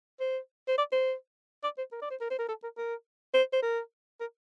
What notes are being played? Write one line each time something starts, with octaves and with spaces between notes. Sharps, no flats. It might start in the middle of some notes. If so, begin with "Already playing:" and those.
C5
C5
D5
C5
D5
C5
A#4
D5
C5
A#4
C5
A#4
A4
A#4
A#4
C5
C5
A#4
A#4